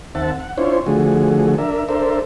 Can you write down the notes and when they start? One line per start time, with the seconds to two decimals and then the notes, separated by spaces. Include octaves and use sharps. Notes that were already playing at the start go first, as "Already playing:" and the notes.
0.15 D#2 C4 E5 F#5 A5
0.40 F#5
0.58 C#4 D4 E4 F4 C5 C#5
0.86 D3 F3 A3 F#4 G#4
1.58 D4 A#4 E5
1.89 D4 A4 A#4 C5 E5